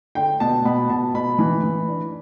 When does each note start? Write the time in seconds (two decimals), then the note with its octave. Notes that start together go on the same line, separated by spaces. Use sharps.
0.15 D3 G5
0.40 B2 A5
0.65 B2 B5
0.90 B2 A5
1.14 B2 B5
1.39 E3
1.63 E3
1.88 D4